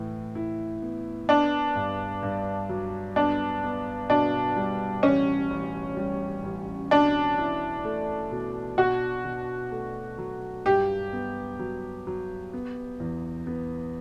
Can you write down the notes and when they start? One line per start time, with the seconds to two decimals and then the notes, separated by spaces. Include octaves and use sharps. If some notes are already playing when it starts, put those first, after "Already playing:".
Already playing: A2 E3
0.35 E4
0.82 B3
1.29 B3 D4
1.75 G2
2.23 G2
2.69 F#3
3.16 B3 D4
3.64 B3
4.10 B2 D4
4.57 G3
5.03 A1 C#4
5.50 A1
5.97 G3
6.43 A1
6.91 B2 D4
7.38 E4
7.85 A3
8.32 B2
8.78 B2 F#4
9.25 B2
9.71 A3
10.18 F#3
10.66 G2 G4
11.13 B3
11.59 F#3
12.07 F#3
12.53 B3
13.00 E2
13.47 B3